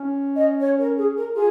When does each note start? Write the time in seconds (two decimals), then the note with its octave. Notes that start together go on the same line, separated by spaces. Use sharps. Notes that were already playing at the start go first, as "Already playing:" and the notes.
Already playing: C#4
0.36 D#5
0.61 C#5
0.79 A#4
0.97 G#4
1.17 A#4
1.35 F4 G#4